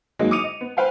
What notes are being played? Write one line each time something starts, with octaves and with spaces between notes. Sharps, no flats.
E3 F#3 G#3 A#3 D#4
D6 D#6 C#7 D#7 F7
D#5
B3
B4 C5 F5 G5 G#5